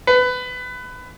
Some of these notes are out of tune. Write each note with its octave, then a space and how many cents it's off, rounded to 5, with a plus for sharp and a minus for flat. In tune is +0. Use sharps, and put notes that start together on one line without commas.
B4 +20